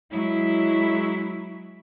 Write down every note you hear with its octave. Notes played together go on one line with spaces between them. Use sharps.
F#3 G#3 E4